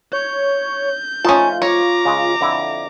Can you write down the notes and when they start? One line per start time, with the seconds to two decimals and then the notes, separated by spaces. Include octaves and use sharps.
0.13 C#5 G6
1.25 F3 A3 C#4 D#4 F4 A5
1.62 C#5 A#5 D6
2.05 C#3 G#3
2.41 F2 D3 E4